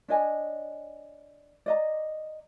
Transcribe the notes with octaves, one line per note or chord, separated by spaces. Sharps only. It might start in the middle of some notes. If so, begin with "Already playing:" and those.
D4 C#5 D#5 G#5
D5 D#5 A#5